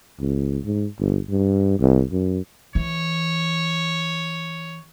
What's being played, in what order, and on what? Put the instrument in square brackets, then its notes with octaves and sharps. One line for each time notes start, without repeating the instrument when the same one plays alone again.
[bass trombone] C#2
G#2
G1
G2
C2
F#2
[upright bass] E3 [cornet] C#5